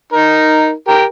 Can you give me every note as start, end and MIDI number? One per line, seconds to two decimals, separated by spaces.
0.13 0.72 63
0.13 0.72 70
0.88 1.04 67
0.88 1.04 70